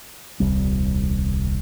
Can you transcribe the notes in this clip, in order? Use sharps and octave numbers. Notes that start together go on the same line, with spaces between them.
D#1 C2 G3